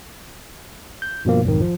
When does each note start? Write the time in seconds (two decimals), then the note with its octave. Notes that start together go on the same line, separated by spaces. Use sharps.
1.02 G6
1.25 G2 B2 F3 A#3
1.44 B1 F2 G#2 D#3
1.61 F3